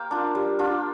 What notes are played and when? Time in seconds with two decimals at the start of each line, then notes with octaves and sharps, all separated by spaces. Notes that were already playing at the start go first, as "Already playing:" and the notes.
Already playing: A#3 C5 F5 G5
0.11 D4 F4
0.35 G3
0.59 D4 F4